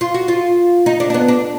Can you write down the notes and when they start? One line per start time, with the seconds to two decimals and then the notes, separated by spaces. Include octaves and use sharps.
0.01 F4
0.14 F#4
0.28 F4
0.86 D#4
1.00 D4
1.10 D4
1.14 B3
1.28 D4